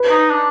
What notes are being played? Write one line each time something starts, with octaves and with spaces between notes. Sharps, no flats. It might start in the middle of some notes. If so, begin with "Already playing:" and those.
Already playing: B4
D#4
D4